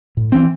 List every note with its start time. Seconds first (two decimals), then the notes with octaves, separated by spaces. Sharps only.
0.17 A2
0.32 E3 C4